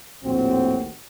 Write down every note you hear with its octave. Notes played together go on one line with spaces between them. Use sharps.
A#1 D#2 A2 C4 F#4